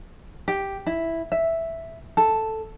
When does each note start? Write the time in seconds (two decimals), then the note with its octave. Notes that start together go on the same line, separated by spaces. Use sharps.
0.48 G4
0.87 E4
1.32 E5
2.17 A4